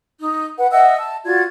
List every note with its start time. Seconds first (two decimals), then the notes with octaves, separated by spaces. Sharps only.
0.20 D#4
0.57 B4 F#5
0.71 D#5 E5 F#5 E6
0.98 A5
1.25 F4 F#4 D5 G#6